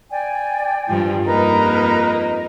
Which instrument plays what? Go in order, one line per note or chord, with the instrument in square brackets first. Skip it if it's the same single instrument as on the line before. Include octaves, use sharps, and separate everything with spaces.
[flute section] D5 G5 G#5
[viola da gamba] G2 F3
[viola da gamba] F2 A#3 D#4 [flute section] A#4 B4 A#5